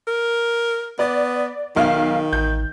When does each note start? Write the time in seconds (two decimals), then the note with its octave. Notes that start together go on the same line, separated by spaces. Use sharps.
0.07 A#4
0.99 B3 D5
1.76 B1 D#3 F5
2.33 A1 G6